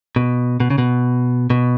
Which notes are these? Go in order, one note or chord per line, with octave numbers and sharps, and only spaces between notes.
B2
B2
C#3
B2
B2